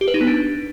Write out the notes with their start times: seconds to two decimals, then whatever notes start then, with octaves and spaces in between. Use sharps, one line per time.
0.01 G4
0.08 B4
0.14 D#4
0.21 B3
0.27 D4